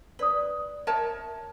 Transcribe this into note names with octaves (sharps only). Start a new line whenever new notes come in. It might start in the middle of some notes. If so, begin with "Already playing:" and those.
A#4 B4 D5 D#6
A#4 C#5 D#5 E5 A5